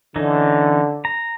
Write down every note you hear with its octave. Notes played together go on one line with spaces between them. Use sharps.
D3 E3 C#4 D#4
A#5